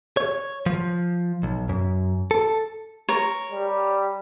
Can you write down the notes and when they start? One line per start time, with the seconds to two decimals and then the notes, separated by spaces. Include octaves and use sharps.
0.17 C#5
0.66 F3
1.43 B1
1.69 F#2
2.31 A4
3.08 A#4 C#5
3.52 G3